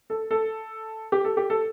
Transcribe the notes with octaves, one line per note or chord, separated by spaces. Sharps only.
A4
A4
G4
A4
G4
A4